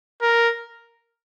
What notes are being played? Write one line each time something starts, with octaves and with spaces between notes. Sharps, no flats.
A#4